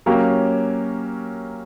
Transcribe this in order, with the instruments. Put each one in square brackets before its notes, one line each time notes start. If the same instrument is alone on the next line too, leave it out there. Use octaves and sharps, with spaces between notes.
[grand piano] F#3 A#3 C#4 G4